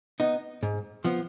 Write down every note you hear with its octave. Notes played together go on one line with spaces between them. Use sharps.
B3 D#4
G#2
F3 B3